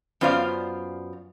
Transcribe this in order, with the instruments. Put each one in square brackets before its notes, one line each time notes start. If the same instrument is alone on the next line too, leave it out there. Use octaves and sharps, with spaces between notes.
[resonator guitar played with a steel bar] F#2 B3 F4 C5 D5 F5